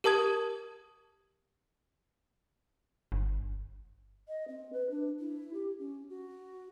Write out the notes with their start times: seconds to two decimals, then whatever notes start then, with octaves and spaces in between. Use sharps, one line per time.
0.04 G4 A#4 A5 D#6 G#6
3.12 G1
4.28 D#5
4.48 C4
4.73 B4
4.90 D4
5.19 E4
5.53 G4
5.79 C#4
6.09 F#4